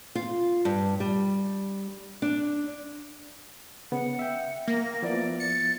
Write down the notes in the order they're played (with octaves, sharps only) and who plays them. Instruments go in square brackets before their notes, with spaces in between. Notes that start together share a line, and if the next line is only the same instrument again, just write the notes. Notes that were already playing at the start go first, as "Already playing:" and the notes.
[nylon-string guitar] F4
G2
G3
D4
[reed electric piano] C#3 B3 [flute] F#5
[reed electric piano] E5 G5
[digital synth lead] A#3 [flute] A#6
[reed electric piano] F3 B3 E4 [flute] D5
[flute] A6 [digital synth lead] C#7